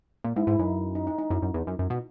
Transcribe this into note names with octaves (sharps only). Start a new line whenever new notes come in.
A#2
G#2 E4
G#2 E4
F#2 D#4
D#4
D#4
D#4
F#2 E4
F#2
E2
F#2
F#2
B2